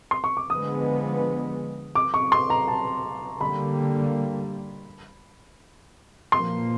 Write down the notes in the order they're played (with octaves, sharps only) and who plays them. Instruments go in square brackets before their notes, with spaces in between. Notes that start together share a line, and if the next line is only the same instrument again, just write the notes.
[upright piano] C6
C#6
D6
[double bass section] D3 F3 G#3 B3 [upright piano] D#6
[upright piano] D6
C#6
C6
A#5
A5
[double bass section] D3 G3 A#3 [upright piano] B5
[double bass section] A#2 F3 A#3 [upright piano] C6